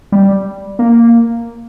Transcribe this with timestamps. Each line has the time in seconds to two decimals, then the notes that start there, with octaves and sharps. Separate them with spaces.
0.12 G3
0.79 A#3